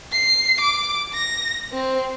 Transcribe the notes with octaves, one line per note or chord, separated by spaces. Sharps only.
C7
D6
A#6
C4